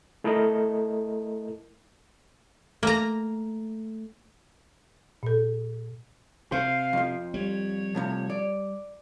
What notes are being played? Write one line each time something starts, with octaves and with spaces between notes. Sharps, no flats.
A3 E4 A4 A#4 D#5
A3 A#3 A#5
A#2 A4
C3 C5 F5
F2 F3
G3 C#5
A2 C3 F3
D5